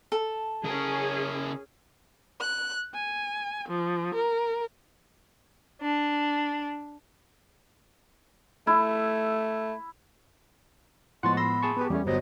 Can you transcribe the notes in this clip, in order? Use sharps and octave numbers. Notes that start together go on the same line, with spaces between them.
A4
C#3 C#4 G#4 A#4
F#6
G#5
F3
A#4
D4
A3 E4
A2 F3 G#3 B3 F#5 C6 C#6 A6
B5 C6 E6 A#6
G#4 A5 C#6
B3 G4 B4
E2 G3 A3 C#4
G1 F#3 B3 C5 D#5